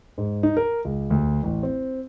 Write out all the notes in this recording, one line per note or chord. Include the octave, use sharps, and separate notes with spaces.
G#2
D#4
A#4
C#2
D2
A1
C4